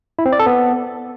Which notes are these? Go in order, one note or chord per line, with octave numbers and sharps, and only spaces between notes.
E4
C4
D5
A4
B3